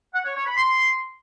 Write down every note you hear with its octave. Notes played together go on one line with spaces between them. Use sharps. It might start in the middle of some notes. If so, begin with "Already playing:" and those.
F#5
C#5
C#5
B5
C6